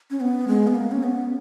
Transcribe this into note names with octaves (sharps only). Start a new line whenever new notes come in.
C#4
B3
G#3
B3
A#3
C#4
B3